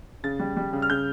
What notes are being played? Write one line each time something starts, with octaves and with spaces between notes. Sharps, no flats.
C#3 A6
G3
G3
C#3
F6
C#3 G6